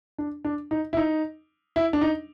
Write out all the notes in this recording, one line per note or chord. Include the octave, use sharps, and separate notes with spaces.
D4
D4
D#4
E4
D#4
E4
D4
D#4